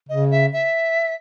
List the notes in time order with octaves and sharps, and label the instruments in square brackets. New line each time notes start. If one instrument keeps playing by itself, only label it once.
[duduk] C#3 [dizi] D#5
[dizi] E5
E5